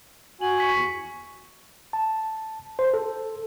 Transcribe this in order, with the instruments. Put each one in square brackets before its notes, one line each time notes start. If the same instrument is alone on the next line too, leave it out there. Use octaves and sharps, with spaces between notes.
[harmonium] F#4 G#5 [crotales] F#7
[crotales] C#6 B6 C#7
[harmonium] E2
[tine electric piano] A5
C5
A4